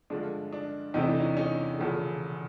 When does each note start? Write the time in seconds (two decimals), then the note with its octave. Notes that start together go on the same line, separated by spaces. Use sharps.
0.10 G2 D3 F3 G#3 D4
0.53 D4
0.94 E2 C3 E3 A3 C4 D#4
1.07 D4
1.20 C#4 D#4
1.37 C#4 D#4
1.78 E1 E2 C#3 F3 A3